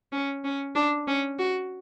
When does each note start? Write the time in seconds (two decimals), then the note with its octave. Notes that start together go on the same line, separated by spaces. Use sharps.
0.12 C#4
0.44 C#4
0.76 D4
1.07 C#4
1.39 F#4